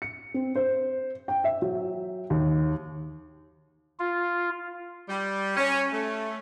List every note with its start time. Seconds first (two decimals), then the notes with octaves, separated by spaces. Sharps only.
0.02 C#7
0.34 C4
0.55 C5
1.28 G5
1.44 E5
1.62 F#3
2.30 D#2
3.99 F4
5.09 G3
5.57 C#4
5.93 A3